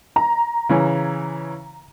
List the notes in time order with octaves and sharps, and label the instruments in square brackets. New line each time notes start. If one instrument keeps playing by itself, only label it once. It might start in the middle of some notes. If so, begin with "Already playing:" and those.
[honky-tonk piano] A#5
[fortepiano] C#3 E3 C#4